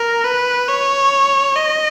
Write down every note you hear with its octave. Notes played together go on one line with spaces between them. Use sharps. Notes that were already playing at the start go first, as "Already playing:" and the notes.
Already playing: A#4
B4
C#5
D#5